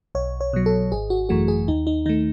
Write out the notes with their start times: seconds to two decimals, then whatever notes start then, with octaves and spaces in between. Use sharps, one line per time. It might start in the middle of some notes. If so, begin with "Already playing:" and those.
0.15 B1 C#5
0.41 C#5
0.53 B2 F#3
0.66 A4
0.92 G#1 G#4
1.10 F#4
1.29 F#2 E3 A3 F#4
1.48 G#4
1.68 D#2 D#4
1.87 D#4
2.06 D#3 A3 D#4